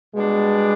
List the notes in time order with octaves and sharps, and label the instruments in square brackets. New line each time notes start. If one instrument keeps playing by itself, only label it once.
[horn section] B2 G3 B3 D4 [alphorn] G#3